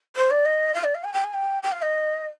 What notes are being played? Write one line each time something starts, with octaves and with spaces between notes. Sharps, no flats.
C5
D5
D#5
F5
D5
F5
G#5
G5
G#5
G5
G5
F5
D#5